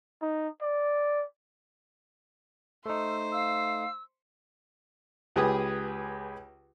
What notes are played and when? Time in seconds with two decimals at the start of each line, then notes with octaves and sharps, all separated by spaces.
0.22 D#4
0.62 D5
2.86 A3 D#4 C5 E6
3.32 F5 E6
5.36 C#2 G4 G#4 B4 D#6